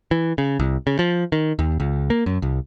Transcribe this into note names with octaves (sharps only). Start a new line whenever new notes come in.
E3
C#3
C2
C#3
F3
D#3
D#2
C#2
A#3
F#2
C2